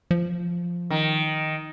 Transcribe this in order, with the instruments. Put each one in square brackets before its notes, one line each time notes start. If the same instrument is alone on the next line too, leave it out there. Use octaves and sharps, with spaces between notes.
[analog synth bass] F3
[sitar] D#3